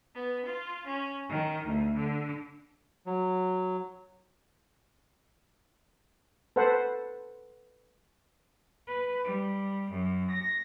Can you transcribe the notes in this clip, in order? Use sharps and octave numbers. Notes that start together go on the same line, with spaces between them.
B3
F4
C#4
D#3
D2
D3
F#3
A4 B4 C5 F#5
B4
G3
F#2
A#6